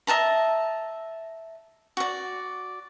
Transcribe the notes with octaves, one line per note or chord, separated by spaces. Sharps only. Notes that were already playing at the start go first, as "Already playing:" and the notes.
D#5 E5 A5 A#5
F#4 D5